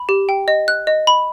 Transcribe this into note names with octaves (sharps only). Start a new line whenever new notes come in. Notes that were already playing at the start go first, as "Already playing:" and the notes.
Already playing: B5
G4
G5
D#5
F#6
D#5
B5